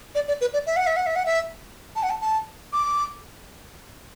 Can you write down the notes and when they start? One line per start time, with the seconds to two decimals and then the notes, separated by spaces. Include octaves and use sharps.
0.15 D5
0.28 D5
0.41 B4
0.53 D5
0.67 E5
0.76 F#5
0.87 E5
0.96 F#5
1.06 E5
1.16 F#5
1.26 E5
1.96 A5
2.03 F#5
2.10 A5
2.21 A5
2.73 D6